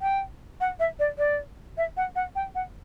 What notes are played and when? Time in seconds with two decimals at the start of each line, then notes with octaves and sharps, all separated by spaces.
0.01 G5
0.60 F#5
0.80 E5
0.99 D5
1.18 D5
1.77 E5
1.97 F#5
2.16 F#5
2.35 G5
2.55 F#5